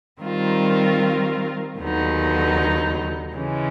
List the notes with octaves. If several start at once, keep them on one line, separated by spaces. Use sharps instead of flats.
D#3 G3 C4 F4 A#4
D#2 D3 F#3 B3 D#4
C#3 E3 G#3 C#4